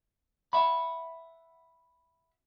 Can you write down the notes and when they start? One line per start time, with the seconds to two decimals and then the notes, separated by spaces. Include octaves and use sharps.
0.53 E5 F#5 B5